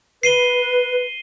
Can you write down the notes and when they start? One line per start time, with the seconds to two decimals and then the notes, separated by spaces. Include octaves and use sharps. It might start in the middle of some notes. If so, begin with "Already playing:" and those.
0.23 B4 C7 D#7 G7